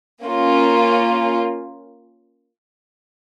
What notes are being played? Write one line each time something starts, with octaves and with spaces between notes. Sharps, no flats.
A#3 C#4 F4